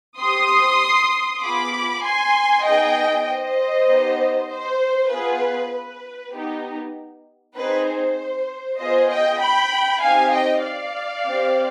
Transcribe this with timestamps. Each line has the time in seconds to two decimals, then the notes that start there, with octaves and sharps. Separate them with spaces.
0.18 C4 G4 C6 D#6
1.41 B3 F4 G#4 B5 D6
2.03 G#5 C6
2.64 B3 D#4 G#4 D#5 G5
3.26 C5 D#5
3.87 B3 D#4 G4
4.49 C5
5.10 B3 F4 G#4 B4
5.72 B4
6.33 B3 D#4 G4
7.56 C4 D#4 G#4 B4
7.86 C5
8.78 B3 F4 G#4 C5 D#5
9.10 D#5 G5
9.40 G5 B5
10.01 C4 D#4 G4 F5 G#5
10.33 D#5 G5
10.63 D5 F5
11.25 C4 G4